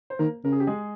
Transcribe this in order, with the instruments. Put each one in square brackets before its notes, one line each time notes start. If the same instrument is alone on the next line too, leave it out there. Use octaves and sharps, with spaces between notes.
[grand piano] C5
[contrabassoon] D#3 [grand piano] A#3 A#4
[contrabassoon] C#3 [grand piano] A#4
[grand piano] G#4
G4
G#3 G#4